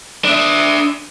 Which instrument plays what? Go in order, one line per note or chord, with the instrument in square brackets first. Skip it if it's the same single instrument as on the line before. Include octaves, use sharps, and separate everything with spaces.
[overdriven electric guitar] D4 E5